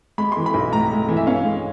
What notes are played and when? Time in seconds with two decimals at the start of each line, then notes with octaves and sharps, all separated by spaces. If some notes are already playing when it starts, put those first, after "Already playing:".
0.18 G#3 B5
0.32 E3 C6
0.46 B5
0.54 B1
0.72 A2 A#5
0.91 G#3
1.09 E3
1.17 E5
1.27 C#4 F5
1.44 G#3